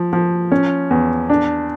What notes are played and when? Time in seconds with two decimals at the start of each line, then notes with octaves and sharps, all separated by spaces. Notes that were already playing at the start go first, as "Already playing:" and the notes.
Already playing: F3
0.13 F3
0.52 C#4
0.91 E2
1.30 D4